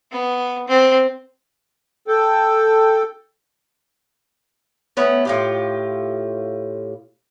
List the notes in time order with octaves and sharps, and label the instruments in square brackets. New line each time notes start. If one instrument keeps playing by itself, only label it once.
[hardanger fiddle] B3
C4
[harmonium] A4 G5
[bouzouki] A3 B3 C#4 F#5
A2 F4 G4